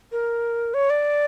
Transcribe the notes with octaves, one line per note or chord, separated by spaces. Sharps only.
A#4
C#5
D5